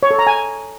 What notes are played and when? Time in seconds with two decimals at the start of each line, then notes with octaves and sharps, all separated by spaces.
0.03 C#5
0.11 A4
0.19 A#5
0.27 G#5